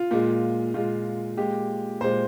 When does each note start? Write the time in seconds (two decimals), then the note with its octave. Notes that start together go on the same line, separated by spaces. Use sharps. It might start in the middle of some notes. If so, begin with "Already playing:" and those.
Already playing: F4
0.11 A#2 G#3
0.74 A#2 G#3 F4
1.37 A#2 G#3 G4
2.01 A#2 G#3 C5